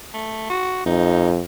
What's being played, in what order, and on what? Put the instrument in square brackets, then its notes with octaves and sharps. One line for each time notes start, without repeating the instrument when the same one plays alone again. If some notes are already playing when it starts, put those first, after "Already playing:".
[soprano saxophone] A3
F#4
[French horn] F2 [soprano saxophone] D#4